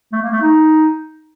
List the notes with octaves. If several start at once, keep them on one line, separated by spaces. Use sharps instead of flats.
A3
A#3
A3
D#4